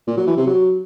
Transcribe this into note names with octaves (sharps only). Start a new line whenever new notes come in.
A#2
F#3
E3
C3
F#3